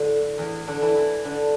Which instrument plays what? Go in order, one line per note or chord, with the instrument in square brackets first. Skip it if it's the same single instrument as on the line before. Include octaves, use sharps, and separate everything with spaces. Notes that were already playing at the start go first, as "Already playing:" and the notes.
Already playing: [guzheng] A2 D3 A3
E2 E3
D3 D4
E3 E4
E3 E4
D3 D4